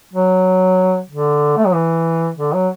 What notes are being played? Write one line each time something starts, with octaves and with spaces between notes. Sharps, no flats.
F#3
D3
A3
F#3
E3
D3
F#3